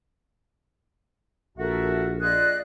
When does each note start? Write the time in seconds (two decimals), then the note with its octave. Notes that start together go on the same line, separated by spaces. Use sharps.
1.58 A#1 F#4 A4 A#4 E5
2.21 F4 G#4 D5 D#5 F#6